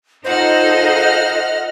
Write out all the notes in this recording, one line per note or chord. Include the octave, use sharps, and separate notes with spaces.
D#4 F4 A4 C5 D#5 F#5 F6